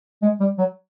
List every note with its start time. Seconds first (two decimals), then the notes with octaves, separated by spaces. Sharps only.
0.22 G#3
0.40 G3
0.58 F#3